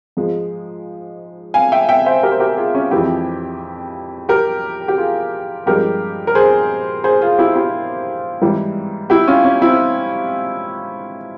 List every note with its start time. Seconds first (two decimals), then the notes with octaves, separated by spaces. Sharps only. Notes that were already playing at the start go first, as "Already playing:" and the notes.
0.17 G#2 F3 G#3
1.54 F5 G#5
1.72 E5 G5
1.89 E5 G5
2.06 C5 E5
2.23 G4 A#4
2.32 C5
2.40 G4 A#4
2.57 F4 G#4
2.75 C#4 F4
2.91 F2 E3 G#3 E4 G4
4.29 G4 A#4
4.88 G4
4.98 F4 G#4
5.66 G2 F3 G#3 G4 A#4
6.27 A#4
6.35 G#4 C5
7.04 G#4 C5
7.21 F4 G#4
7.38 E4 G4
7.56 E4 G4
8.42 G#2 E3 G3
9.10 E4 G4
9.27 C#4 F4
9.45 C#4
9.61 C4 E4